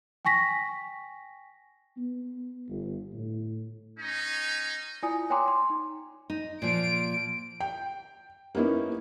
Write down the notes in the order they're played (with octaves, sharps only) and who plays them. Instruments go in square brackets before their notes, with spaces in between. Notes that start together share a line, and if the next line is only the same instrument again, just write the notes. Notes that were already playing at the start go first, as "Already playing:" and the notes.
[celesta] G5 G#5 C#6 A#6 B6
[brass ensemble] B3
G1
A2
[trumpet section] C#4 D#4
[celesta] E4 F4 D5 G#5 D#6
C#5 G5 G#5 A#5 C6 D6
C6
D#4
[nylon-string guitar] D#4
[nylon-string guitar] A#2 F3 [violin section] D7
[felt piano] G5
A#3 B3 C#4 D#4 E4